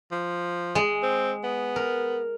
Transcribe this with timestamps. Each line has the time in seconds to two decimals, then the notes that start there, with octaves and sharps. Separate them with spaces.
0.12 F3
0.75 G#3
1.03 C4
1.44 B3
1.76 A#4